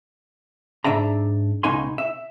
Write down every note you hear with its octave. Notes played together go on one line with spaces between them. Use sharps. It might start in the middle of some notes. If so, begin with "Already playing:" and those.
G#2 D4 D5 E5 A#5
C#2 B2 D#4 G#5 C6
E5